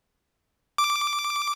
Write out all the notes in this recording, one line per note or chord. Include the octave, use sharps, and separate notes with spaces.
D6